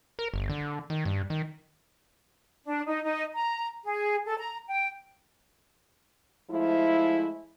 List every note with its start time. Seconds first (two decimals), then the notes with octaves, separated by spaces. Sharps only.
0.19 A#4
0.34 G1
0.50 D3
0.90 D#3
1.05 G2
1.30 D#3
2.65 D4
2.86 D#4
3.04 D#4
3.34 A#5
3.84 G#4
4.26 A4
4.39 A#5
4.68 G5
6.50 F3 G#3 A3 E4